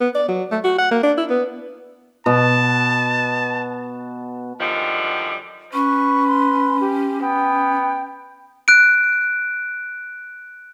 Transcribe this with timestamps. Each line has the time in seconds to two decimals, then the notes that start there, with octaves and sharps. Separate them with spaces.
0.01 B3
0.15 D5
0.28 F#3
0.51 A3
0.64 F#4
0.78 F#5
0.91 A#3
1.03 D4
1.17 E4
1.30 B3
2.26 B2 A5
4.60 F#2 D3 D#3 F3 G3
5.73 C#4 B4 C#6
6.27 C6
6.81 G4
7.21 B3 G5
8.68 F#6 D7